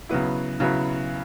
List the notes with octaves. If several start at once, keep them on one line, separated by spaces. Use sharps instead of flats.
C#3 F#3 B3 E4
C#3 F#3 B3 E4